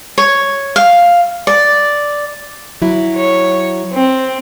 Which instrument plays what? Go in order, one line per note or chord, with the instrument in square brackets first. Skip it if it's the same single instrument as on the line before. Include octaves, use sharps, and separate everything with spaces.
[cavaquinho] C#5
F5
D5
[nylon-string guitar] F#3 E4
[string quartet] C#5
C4